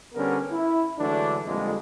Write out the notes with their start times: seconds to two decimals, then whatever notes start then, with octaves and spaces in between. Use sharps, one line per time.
0.14 D3 G3 B3 C#4 A#4
0.51 E4
0.99 D3 E3 F#3 G#3 A3 D4
1.45 F2 A#2 D3 G3 G#3